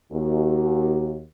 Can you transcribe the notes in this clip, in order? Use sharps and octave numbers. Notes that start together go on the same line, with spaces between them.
D#2 F#4